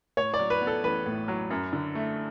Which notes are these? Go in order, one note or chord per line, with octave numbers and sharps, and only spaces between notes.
A2 C#5
D5
F#3
B4
B3
A4
A1 B4
A2
F#3
F#2
D3
A3